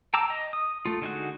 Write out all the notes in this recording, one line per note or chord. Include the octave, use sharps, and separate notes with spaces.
G5 A5 A#5 D6 E6
D#5
D#6
A3 F4
D3 G#3 D#4 F#4